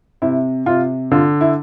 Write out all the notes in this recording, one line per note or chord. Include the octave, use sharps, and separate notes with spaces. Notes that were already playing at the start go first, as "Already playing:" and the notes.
C3 E4
C3 F4
D3 F4
E4